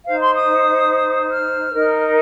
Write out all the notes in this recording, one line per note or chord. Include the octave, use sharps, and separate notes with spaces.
D#4 C5 F5
C6
D#6
F6
D#4 A#4